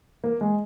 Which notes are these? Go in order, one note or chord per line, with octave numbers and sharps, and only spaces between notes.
A#3
G#3